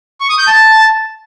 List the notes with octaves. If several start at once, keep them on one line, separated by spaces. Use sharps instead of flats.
C#6
D#6
G6
A5